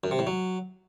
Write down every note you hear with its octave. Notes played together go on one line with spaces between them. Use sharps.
F#2
C3
A2
F#3